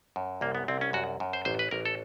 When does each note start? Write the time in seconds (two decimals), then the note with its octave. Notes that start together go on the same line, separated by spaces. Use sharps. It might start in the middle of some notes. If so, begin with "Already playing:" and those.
0.16 F#2
0.41 C2 A#3
0.55 B3
0.68 C2 C4
0.81 C#4
0.93 F#2 F#4
1.20 F#2
1.33 C5
1.45 A1 C5
1.59 B4
1.71 A1 A#4
1.85 A4